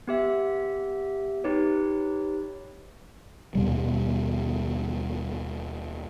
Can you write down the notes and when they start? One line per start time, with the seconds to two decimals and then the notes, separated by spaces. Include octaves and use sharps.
0.08 B3 G4 E5
1.44 D#4 G4 B4 C#5
3.55 D#2 B2 G3